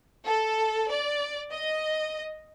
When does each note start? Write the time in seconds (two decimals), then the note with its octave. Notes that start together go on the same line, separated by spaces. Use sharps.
0.25 A4
0.90 D5
1.50 D#5